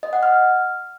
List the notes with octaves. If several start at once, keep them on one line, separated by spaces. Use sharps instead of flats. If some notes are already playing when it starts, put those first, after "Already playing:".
D#5
F#5
F6